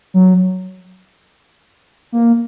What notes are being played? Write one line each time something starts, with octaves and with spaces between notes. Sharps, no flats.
F#3
A#3